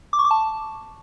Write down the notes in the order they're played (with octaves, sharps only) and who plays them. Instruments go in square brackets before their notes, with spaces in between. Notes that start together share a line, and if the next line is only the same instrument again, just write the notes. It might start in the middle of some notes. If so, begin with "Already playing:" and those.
[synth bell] D6
C#6
D6
A5